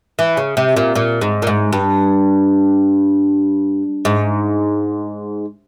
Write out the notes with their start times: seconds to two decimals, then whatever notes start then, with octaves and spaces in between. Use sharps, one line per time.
0.19 E3
0.37 C#3
0.57 C3
0.76 A#2
0.95 A#2
1.21 G#2
1.42 A#2
1.47 G#2
1.73 G2
4.05 G#2